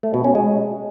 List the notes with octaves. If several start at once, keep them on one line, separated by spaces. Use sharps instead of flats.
A3
B2
C#4
G#3